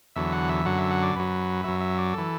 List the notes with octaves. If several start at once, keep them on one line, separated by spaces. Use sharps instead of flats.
E2 D3 F#3 E5
F#5
E5
F#2 D3 F#3 F#5
E5
F#5
D5
F#2 F#3 B4
F#2 F#3 E5
E5
D5
E3 A4